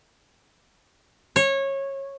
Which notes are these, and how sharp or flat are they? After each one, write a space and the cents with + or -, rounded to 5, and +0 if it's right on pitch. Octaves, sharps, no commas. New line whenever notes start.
C#5 -20